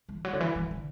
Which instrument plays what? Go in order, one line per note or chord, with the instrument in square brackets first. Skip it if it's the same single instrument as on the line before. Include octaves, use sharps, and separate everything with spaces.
[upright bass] E3
F#3
D3
E3
E3
D3